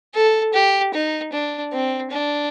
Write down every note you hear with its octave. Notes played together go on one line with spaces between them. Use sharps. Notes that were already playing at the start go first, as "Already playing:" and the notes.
A4
G4
D#4
D4
C4
D4